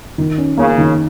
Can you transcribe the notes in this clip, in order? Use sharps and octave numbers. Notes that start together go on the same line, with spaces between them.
D#3
C#4
C#3 A#3
D#3